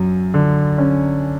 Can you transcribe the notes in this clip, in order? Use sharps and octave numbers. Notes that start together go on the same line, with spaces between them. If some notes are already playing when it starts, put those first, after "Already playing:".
Already playing: F#2 F#3
D3
C#4